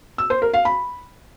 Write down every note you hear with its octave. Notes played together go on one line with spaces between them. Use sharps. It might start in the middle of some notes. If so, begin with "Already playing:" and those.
E6
C5
A#4
F5
B5